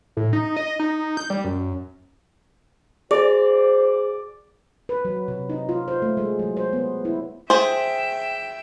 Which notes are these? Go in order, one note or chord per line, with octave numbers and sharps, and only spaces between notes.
A2
D#4
D#5
D#4
G6
G3
F#2
F#4 G#4 C5 D5
B4
F#3
C3
D#4
F4
C5
A3
G#3
F#3
C5
B3
E4
G#4 C5 E5 G5